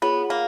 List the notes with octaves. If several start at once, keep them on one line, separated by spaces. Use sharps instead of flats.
B3 F4 G#4 C#5 F#5
A#3